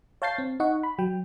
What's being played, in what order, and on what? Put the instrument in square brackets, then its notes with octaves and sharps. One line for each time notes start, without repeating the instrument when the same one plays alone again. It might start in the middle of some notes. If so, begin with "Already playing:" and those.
[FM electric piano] C#5 F5 A5 G6 A6 C7
C4
D#4 D#5 F#5 C#6
B5
F#3 G5